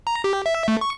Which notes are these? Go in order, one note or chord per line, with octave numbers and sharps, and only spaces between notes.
A#5
G4
E5
A3
C#6